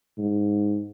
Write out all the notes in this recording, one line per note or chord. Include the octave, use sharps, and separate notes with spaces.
G#2